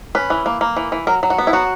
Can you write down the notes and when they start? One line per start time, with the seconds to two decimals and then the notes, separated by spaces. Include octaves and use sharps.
0.15 C#4 B4
0.30 E3
0.46 A#3
0.61 A#3
0.77 E3
0.92 E3
1.07 F#3 A#4
1.23 F#3
1.30 F#4
1.38 B3
1.47 E4
1.53 F#3 F#4